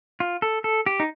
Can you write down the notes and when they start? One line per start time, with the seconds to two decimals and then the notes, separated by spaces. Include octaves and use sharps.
0.20 F4
0.42 A4
0.64 A4
0.86 G4
1.00 D#4